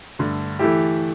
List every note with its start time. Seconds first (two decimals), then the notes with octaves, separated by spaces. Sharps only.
0.19 G2 D3 A3
0.59 E3 A3 E4 G4